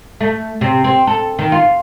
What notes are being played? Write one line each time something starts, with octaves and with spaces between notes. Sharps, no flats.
A3
C3
C4
A4
D#3
F4